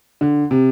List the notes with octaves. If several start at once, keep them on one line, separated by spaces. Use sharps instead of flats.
D3
C3